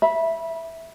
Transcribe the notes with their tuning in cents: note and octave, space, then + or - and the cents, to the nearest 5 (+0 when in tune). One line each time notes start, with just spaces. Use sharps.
E5 +0 B5 -25